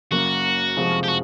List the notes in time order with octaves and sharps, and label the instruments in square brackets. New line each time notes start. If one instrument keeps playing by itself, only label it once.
[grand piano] F#1 F#2 C#3 F#3 A#3 [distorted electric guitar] F#4
[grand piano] F1 F2 C3 F3 G#3
[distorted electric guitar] G4
F#4